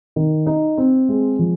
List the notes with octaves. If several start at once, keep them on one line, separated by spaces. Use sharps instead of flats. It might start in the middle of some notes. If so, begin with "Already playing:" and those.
D#3
D#4
C4
G#3
F3